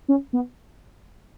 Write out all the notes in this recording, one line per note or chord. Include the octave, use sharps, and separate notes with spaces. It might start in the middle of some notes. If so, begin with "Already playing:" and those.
C#4
B3